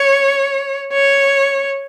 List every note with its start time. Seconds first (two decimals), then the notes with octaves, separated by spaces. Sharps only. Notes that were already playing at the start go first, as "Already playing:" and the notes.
Already playing: C#5
0.93 C#5